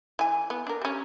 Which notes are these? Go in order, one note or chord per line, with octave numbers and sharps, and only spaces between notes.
E3 G#5
B3
D4 A#4
G3 C#4